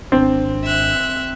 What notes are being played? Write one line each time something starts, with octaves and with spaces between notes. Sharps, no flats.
G#1 C4 D4
E5 F#6